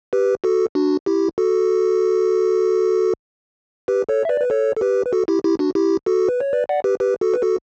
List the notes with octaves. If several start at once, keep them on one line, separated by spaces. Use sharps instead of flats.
G4 B4
F#4 A4
D4 F#4
E4 G4
F#4 A4
G4 B4
A4 C#5
E5
B4 D5
B4
A4 C#5
A4
G4 B4
B4
F#4 A4
E4 G4
E4 G4
D4 F#4
E4 G4
F#4 A4
B4
C#5
B4 D5
D5 F#5
G4 B4
G4 B4
F#4 A4
B4
F#4 A4